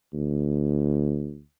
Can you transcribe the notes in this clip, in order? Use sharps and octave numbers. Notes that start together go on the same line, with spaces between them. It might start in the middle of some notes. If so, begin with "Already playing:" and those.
D2